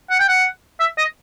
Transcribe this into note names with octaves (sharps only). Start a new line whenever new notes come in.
F#5
G5
F#5
E5
D#5